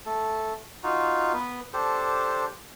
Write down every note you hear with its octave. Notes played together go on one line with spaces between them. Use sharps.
A3 A4
D#4 F4 F#4
B3 B4
D4 G4 A4 C5